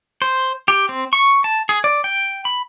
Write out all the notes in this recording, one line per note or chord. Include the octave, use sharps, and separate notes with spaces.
C5
G4
C4
C#6
A5
G#4
D5
G5
B5